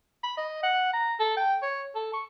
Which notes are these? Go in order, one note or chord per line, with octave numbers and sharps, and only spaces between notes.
B5
D#5
F#5
A#5
A4
G5
C#5
A4
C#6